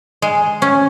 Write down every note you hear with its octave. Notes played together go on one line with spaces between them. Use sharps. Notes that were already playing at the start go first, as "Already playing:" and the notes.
G#3
C#4